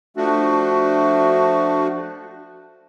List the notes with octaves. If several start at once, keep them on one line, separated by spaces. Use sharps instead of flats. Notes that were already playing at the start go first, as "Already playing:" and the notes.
F3 A3 D4 F#4